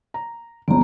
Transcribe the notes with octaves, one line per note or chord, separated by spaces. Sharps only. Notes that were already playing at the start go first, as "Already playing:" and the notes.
A#5
G1 C#2 F3 B3 A#5